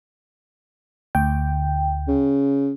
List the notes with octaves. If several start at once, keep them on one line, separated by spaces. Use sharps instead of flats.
D2 G5
C#3